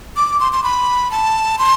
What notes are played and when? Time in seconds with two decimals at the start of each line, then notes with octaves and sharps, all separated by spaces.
0.16 D6
0.40 C6
0.53 C6
0.64 B5
1.11 A5
1.59 C6